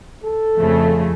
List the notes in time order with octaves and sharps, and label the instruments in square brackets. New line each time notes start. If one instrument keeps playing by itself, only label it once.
[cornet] A4
[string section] F2 C#3 A3